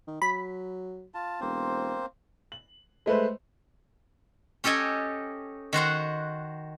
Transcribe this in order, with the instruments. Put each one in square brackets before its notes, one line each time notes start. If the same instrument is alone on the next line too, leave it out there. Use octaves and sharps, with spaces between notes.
[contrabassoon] D#3
[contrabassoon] F#3 [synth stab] B5
[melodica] F4 A5
[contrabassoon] E1 [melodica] A#3 C4 C5
[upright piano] F#7
G#3 A3 B4 C5
[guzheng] C#4 G4 A4 D#5 G#5
D#3 F#4 C5 F#5